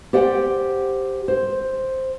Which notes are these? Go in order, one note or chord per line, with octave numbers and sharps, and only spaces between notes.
G4 C5 D5 F#5 G5
C5